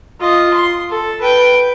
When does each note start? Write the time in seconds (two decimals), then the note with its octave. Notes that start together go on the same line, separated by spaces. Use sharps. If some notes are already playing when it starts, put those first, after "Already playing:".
0.20 F4 D#5
0.54 C6
0.90 A4
1.21 B4 G5